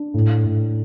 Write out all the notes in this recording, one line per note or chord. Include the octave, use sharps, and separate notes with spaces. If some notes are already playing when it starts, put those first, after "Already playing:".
Already playing: D4
A2
A2